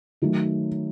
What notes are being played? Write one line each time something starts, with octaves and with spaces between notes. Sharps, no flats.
D#3 F#3 A3